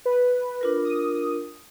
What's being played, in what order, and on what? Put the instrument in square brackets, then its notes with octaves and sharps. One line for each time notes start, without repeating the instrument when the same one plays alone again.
[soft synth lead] B4
[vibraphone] D4 F4 A#4
[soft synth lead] D#6